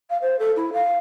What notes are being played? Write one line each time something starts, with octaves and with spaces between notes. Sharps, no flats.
F5
C5
A4
E4
F5